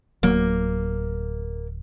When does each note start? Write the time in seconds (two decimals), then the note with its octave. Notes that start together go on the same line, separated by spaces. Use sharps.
0.23 D1 F#3 A#3